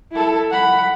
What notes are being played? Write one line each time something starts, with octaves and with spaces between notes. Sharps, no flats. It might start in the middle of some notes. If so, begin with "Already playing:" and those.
E4 A4
F#5 B5